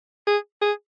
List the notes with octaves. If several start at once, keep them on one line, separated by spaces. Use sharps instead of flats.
G#4
G#4